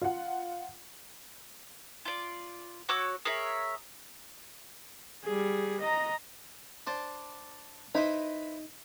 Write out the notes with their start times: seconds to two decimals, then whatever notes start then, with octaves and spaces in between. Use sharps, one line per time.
0.01 F4 F#5
2.05 F4 D5
2.89 F#4 C#5 D6 E6
3.25 G#4 A#4 C#5 E5
5.24 G3 G#4
5.81 D#5 A#5
6.87 D4 C5 D5
7.95 D#4 E4 B4 C5